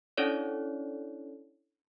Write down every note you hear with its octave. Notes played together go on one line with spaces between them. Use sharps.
C#4 D4 E4 A4 C#5 D5